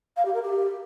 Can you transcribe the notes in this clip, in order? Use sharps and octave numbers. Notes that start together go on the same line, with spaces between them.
F5
G4
A#4
G4